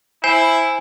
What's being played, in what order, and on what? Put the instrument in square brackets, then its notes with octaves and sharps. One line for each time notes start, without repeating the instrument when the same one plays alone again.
[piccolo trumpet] E4 [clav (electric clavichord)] C5 [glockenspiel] G#5